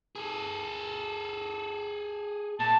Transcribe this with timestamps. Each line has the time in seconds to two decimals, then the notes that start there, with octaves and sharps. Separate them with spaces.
0.16 G#4 A4
2.60 A#2 A5